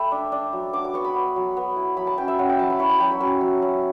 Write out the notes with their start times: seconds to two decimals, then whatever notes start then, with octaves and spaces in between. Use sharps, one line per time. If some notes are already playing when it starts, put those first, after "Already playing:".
Already playing: A3 E5 G5 B5
0.11 D4
0.32 D4
0.53 F#3
0.73 D4 D6
0.84 D6
0.94 B3 C#6
1.05 B5
1.15 B3
1.36 F#3
1.57 B3
1.76 E4
1.97 F#3 B5
2.07 A5
2.18 C#4 G5
2.28 E5
2.39 C#4 F#5
2.49 G5
2.59 F#3 A5
2.70 B5
2.79 E4 C#6
2.89 B5
3.00 F#3 G5
3.11 B5
3.20 C#4 C#6
3.41 F#3
3.62 C#4